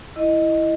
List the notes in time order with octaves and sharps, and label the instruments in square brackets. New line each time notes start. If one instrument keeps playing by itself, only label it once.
[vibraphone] E4 D#5